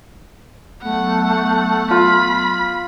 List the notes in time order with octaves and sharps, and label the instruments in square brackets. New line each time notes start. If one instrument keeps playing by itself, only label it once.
[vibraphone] F#3 B3 [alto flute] A3 [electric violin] F#5
[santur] F4 [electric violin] B5